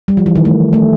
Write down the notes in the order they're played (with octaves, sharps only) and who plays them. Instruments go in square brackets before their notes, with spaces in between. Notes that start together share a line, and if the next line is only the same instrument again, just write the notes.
[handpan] G3
F3
E3
D#3
A3
A3